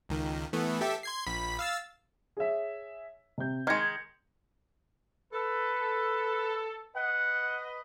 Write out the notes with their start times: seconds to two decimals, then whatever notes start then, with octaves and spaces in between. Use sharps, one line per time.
0.09 C#2 D#3
0.53 E3 A3 B3
0.81 G4 A4 E5
1.03 C6 G#6 C7
1.27 A#1 B5 B6
1.59 F5 E6 A6
2.37 G#4 C#5 E5
3.38 C3 G6
3.67 D#3 G#3 F6 G#6 A#6 C#7
5.33 A4 B4
6.96 B4 D#5 F#5